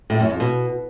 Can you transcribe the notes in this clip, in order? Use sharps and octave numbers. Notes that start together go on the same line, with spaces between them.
A2
F#2
F2
B2